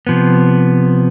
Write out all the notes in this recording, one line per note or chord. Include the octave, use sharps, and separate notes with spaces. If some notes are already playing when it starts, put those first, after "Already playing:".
C3 F3 B3